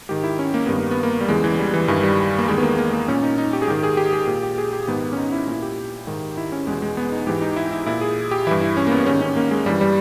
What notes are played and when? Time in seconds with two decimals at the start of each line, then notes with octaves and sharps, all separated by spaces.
0.09 G#2 D#3 G4
0.24 E4
0.39 C#4
0.54 A#3
0.66 G2 D#3 B3
0.78 A#3
0.91 B3
1.03 A#3
1.20 G3
1.29 E2 C#3 E3 G#3
1.44 E3
1.59 G3
1.74 E3
1.88 G2 D#3 E3
2.03 G3
2.39 A#3
2.48 E2 D#3 G#3
2.58 B3
2.63 A#3
2.78 A#3
2.93 A#3
3.08 A#2 C#4
3.23 D#4
3.38 D#4
3.53 G4
3.62 G#4
3.67 G#2 D#3 G4
3.83 G#4
3.97 G4
4.13 G#4
4.28 A#2 G4
4.43 G4
4.58 G#4
4.73 G4
4.87 G#2 D#3 B3
5.03 B3
5.13 C#4
5.18 D#4
5.32 E4
5.47 A#2 E4
5.62 G4
6.07 G#2 D#3
6.37 E4
6.52 C#4
6.67 E2 B2 G#3
6.82 G#3
6.97 B3
7.12 D#4
7.27 G#2 E3 G4
7.42 D#4
7.56 E4
7.71 E4
7.86 A#2 E4
8.01 G#4
8.31 G4
8.47 G2 E3 E4
8.61 E4
8.77 C#4
8.87 A#3
8.92 B3
9.06 G#2 D#3 C#4
9.21 C#4
9.36 A#3
9.51 G#3
9.66 G2 E3 G3
9.81 G3